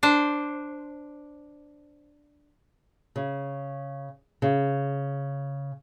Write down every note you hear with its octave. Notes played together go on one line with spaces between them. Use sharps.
D4 C5
C#3
C#3